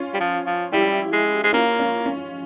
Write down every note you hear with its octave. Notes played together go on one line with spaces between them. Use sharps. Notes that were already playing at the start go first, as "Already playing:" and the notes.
Already playing: C#4 F4
G3
F3
F3
G3 E4 G4
G#3
G#3
A#3 C#4 F4
C#4
C#4